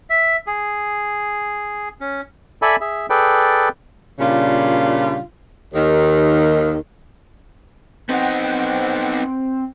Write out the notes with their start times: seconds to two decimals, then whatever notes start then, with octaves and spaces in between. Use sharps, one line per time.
0.10 E5
0.47 G#4
2.01 C#4
2.62 A4 D5 E5 G#5 B5
2.81 G#4 E5
3.10 G#4 A4 B4 D5 G5
4.19 A#2 C#3 G3 D4 F4
5.73 D#2 D#3
8.09 B3 C4 D#4 F#5 G5